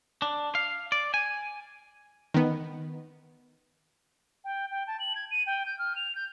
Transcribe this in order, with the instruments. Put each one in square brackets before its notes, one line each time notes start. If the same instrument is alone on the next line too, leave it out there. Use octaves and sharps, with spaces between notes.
[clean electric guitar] D4
F5
D5
G#5
[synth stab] D#3 B3
[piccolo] G5
G5
A5
F#7
G#6
D#7
G5
G6
F6
F7
G6